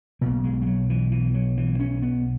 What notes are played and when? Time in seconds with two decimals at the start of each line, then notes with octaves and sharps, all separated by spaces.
0.21 B1 B2 A#3
0.44 G#3
0.62 G#3
0.66 F#3
0.90 E3
1.12 E3
1.34 F#3
1.57 E3
1.80 C#4
2.02 B3